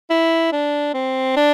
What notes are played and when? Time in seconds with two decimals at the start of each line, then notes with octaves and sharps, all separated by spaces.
0.10 E4
0.52 D4
0.94 C4
1.36 D4